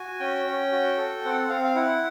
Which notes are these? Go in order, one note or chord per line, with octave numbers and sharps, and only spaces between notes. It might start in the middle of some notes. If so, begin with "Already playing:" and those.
Already playing: F#4 G#5
C#4 G5
C#4
F#4
A4
C4 F#5
C4 F5
F5
E4 F#5